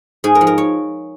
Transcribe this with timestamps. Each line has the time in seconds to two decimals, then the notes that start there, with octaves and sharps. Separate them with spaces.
0.24 G#2 G#4
0.35 A#4
0.41 F3
0.47 A#4
0.58 C#5